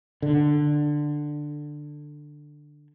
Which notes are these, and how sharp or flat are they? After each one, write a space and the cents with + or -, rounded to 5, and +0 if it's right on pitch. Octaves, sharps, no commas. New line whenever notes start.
D3 +10